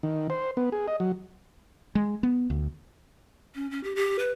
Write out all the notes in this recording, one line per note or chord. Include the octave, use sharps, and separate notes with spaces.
D#3
C5
B3
G#4
D#5
F#3
G#3
B3
D2
C#4
C#4
G4
G4
B4